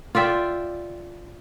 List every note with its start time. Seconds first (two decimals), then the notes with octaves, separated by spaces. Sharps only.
0.15 F4 D5 E5 G5